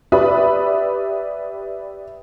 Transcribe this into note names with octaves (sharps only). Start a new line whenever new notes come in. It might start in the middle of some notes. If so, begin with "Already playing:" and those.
G4 B4 D5 E5 B5 D#6